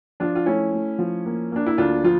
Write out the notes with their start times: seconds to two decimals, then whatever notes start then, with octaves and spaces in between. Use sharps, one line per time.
0.20 F3 D4 F4
0.35 F4
0.46 A3 C#4 E4
0.73 A3
0.99 F3
1.26 A#3
1.52 A#3 D4
1.66 E4
1.78 D2 D4 F4
2.04 F3 F4